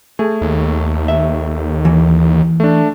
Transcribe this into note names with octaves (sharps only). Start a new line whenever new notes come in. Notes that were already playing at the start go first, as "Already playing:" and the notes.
A3 G#4
D#2
E5
E3
A3 D4